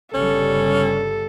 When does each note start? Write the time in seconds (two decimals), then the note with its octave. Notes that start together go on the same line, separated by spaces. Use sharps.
0.14 G1 C#3 G3 C#4 A4